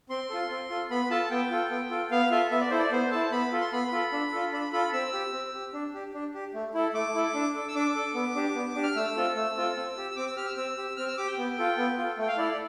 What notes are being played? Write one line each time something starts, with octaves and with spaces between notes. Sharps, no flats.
C4 C6
F4 A4
C4
F4 A4
B3 B5
F4 A4 A5
B3 G5
F4 A4
B3
F4 A4
B3 F5
F4 A4 E5
B3 E5
D5
E4 A4 C5
D5
B3 C5
E4 A4 A5
B3 B5
F4 A4
C6
B3 B5
F4 A4
D4
F4 A4
D4 B5
F4 A4 B5
C4 E6
G4
C4
G4
D4
G4
D4
G4
A3
E4 A4
A3 D6
E4 A4
D4
A4
E6
D4 D6
A4
B3
D4 G4
B3
D4 G4
F6
A3 E6
C4 F4 A4
A3 E6
C4 F4 A4
C4
G4
E6
C4 D6
E6
G4 F6
E6
C4 E6
G4
C4 F6
E6
G4 D6
G5
B3
F4 A4
B3
F4 A4
A3 G5
F5
E4 A4 D5
D5